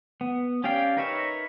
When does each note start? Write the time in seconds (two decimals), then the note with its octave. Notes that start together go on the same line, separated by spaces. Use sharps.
0.21 B3
0.64 C#4 G4 D5 F5 G5
0.97 D#4 A#4 B4 C#5 E5